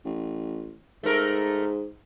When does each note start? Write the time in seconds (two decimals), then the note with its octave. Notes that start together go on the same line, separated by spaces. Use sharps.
0.05 A1
1.04 G#2 A3 A#4